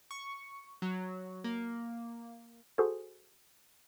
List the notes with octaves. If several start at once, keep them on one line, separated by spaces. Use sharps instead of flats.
C#6
F#3
A#3
F#4 G#4 A4 C5